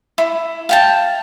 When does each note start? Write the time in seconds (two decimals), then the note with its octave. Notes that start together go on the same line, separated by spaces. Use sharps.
0.18 E4
0.69 F5 G5 A5